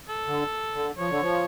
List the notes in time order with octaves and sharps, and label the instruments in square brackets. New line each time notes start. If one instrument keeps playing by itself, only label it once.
[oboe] A4
[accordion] D3
D3
[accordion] F3 [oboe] C#5
[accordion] D3
F3